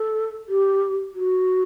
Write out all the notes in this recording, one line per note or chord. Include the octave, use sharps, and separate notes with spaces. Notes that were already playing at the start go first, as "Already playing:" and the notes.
Already playing: A4
G4
F#4